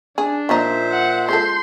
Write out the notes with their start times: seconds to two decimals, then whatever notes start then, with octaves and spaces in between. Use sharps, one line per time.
0.18 D4 G#4
0.49 A#2 F3 A#3 D#4 C5 E5
0.92 F#5
1.29 G#3 F4 A4 C6 G6